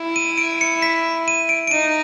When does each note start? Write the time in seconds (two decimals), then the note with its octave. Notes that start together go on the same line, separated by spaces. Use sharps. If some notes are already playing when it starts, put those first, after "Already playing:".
Already playing: E4
0.16 D#7
0.38 D7
0.61 C#7
0.82 B6
1.28 D#7
1.49 D7
1.67 D7
1.71 D#4 D#7